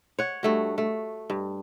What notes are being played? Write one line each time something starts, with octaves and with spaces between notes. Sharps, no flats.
C#5 F#5
G2 A3 F#4
A3
G2